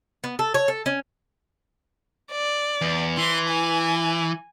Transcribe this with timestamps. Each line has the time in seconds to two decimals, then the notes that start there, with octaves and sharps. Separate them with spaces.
0.24 B3
0.39 A4
0.54 C#5
0.68 A4
0.86 C#4
2.32 D5
2.81 E2
3.18 E3 C6
3.49 G#5